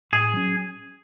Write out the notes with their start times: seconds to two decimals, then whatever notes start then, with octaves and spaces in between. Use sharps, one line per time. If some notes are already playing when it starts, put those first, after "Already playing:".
0.12 A2 G#4
0.33 F#3 C#4